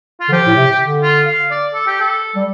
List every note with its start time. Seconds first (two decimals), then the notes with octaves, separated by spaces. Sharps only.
0.21 F4
0.28 D3
0.32 F3 G4
0.46 A2
0.56 C3
0.80 D3
1.03 F4
1.27 F5
1.51 D5
1.74 A4
1.87 G4
2.00 A4
2.36 G3